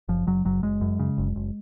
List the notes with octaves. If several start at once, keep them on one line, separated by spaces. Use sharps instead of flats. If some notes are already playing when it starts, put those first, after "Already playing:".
F#1 F3
F#1 F#3
F#1 F#3
F#1 G#3
F#2
C#3
F#1
F#1